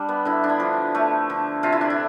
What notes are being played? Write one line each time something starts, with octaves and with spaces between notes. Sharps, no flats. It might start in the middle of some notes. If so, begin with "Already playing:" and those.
Already playing: G3 D4
B3
D3 E4
D4
E4
F3
A3
D3
C3 F4
E4
D4
E4